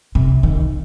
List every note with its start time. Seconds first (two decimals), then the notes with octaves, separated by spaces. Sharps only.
0.15 C3
0.43 D#3